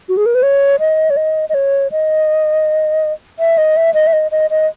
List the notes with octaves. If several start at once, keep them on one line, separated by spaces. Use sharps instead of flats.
F#4
G#4
A#4
B4
C#5
D#5
C#5
D#5
D#5
C#5
D#5
E5
D#5
E5
D#5
E5
D#5
D#5
D#5